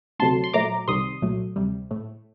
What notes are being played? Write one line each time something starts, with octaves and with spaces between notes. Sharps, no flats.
D2 C3 F#3 A3 A5 C6
C6
A#2 F#3 A3 A#5 D6
C2 C3 D#3 G3 C6 D#6
C2 A#2 F#3 A3
D2 C3 G3
A2 A3